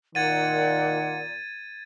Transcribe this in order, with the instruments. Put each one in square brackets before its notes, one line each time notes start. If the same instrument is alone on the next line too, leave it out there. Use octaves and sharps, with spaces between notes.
[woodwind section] A#2 [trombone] D#3 [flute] F#5 [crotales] G#6 A6 D#7